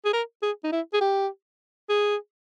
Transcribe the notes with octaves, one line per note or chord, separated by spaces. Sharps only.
G#4
A#4
G#4
D#4
E4
G#4
G4
G#4